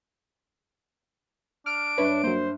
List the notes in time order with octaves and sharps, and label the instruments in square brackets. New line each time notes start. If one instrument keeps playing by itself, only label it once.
[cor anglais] D4 [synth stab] F6 [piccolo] D7
[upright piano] G2 E5 [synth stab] B4 C#5
[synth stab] F#3 A#3 [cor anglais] C5